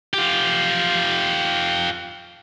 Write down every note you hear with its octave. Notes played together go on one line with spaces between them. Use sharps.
F4 G4